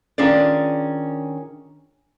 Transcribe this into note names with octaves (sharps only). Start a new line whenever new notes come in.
D#3 C#4 D4 F4 G#4 D5